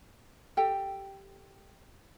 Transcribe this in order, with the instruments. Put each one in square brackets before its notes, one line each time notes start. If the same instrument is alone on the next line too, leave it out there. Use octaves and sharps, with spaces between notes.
[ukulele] G4 A4 G5